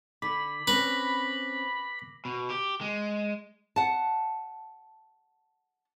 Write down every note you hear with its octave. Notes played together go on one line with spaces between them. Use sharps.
D3 B5 D6 B6
C4 C#4 B4 A#6 B6
B2
G4
G#3
F#5 A5